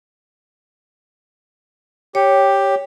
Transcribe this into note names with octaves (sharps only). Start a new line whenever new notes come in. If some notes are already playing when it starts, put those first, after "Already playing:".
G4 C#5